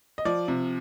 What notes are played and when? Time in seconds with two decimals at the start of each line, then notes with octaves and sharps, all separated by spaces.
0.18 D#5
0.25 F3 D5
0.48 C3